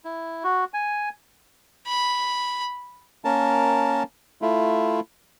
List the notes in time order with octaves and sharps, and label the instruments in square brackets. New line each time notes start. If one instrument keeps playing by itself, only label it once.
[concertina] E4
F#4
G#5
[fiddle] B5
[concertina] A#3 C#4 A#4 A5
A3 E4 F4